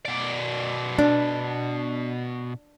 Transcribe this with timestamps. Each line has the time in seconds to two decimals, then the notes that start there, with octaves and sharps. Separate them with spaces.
0.05 B2 D5
0.99 D4